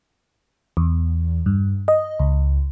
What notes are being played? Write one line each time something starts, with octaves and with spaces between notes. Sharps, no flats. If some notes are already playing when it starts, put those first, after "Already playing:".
E2
G2
D#5
C#2